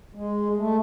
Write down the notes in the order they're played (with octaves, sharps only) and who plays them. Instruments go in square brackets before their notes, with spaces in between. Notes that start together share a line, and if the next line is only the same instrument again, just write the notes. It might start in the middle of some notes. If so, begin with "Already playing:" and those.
[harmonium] G#3
A3